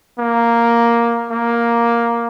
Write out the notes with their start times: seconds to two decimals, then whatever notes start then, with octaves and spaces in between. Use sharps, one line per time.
0.19 A#3
1.31 A#3